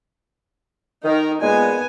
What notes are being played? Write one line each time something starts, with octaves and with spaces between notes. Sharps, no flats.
D#3 D#4 A#4
A#2 G#3 B3 G#5